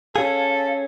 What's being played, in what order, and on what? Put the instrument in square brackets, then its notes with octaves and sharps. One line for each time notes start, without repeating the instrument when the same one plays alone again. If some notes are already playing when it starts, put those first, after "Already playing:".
[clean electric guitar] C#4 G#4 [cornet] A4 [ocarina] F5